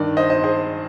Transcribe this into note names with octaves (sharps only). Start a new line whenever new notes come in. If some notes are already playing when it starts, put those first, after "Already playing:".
Already playing: G2 D#3 D5
C5 D#5
C5 D#5
G#4 C5